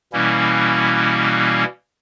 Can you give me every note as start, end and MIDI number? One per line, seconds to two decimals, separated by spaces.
0.13 1.64 47
0.13 1.64 52
0.13 1.64 55
0.13 1.64 58
0.13 1.64 61
0.13 1.64 64